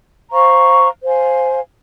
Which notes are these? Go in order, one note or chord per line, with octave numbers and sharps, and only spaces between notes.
C5 F5 A#5 C#6
C5 F5 G#5